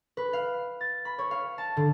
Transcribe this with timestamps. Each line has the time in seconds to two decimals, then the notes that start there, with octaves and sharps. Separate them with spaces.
0.17 B4
0.33 F5
0.81 A6
1.05 B5
1.19 C#5
1.31 F5
1.58 A5
1.77 D3